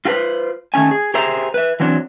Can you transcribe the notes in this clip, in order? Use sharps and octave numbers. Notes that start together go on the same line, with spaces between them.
F4 F#4 A4 B4 C5
D#3 A3 C#4 G#5
G#4
G4 G#4 A#4 C5 E5 A#5
B4 E5
E3 F#3 C4 D4